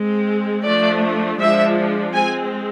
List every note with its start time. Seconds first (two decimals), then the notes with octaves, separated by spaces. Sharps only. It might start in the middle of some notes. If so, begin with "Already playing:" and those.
Already playing: G#3 C4
0.64 F3 A3 D4 D5
1.39 F3 G#3 D4 E5
2.13 G#3 C4 G#5